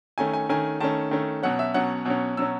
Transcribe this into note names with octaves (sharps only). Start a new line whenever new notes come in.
D#3 A3 C#4 G#5
G#5
D#3 A3 C#4 G#5
D#3 A3 C#4 A5
D#3 A3 C#4
B2 F#3 C#4 F#5
E5
B2 F#3 C#4 F#5
B2 F#3 C#4
B2 F#3 C#4 E6